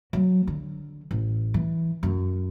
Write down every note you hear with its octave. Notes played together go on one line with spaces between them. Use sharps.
F#3
D3
A1
E3
F#2